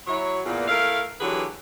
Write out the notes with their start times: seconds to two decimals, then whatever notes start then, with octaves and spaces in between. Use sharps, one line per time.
0.07 F#3 E4 C#5
0.46 E2 A#2
0.68 A3 E4 A#4 F5
1.20 D3 E3 F#3 G4 G#4 B4